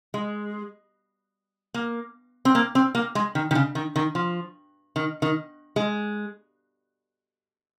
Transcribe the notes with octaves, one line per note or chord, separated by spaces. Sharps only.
G#3
A#3
C4
A#3
C4
A#3
G#3
D#3
D#3
C#3
D#3
D#3
F3
D#3
D#3
G#3